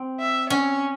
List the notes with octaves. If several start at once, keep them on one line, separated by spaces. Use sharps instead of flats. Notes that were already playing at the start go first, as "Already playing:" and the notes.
Already playing: C4
E5
C#4 C#5